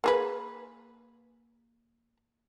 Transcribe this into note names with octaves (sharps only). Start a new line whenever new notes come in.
A#3 G#4 B4